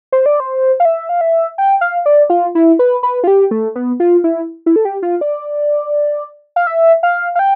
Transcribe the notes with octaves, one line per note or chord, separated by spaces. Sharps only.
C5
D5
C5
F5
E5
F5
E5
G5
F5
D5
F4
E4
B4
B4
F4
G4
A3
B3
F4
E4
E4
A4
G4
F4
D5
F5
E5
F5
F5
G5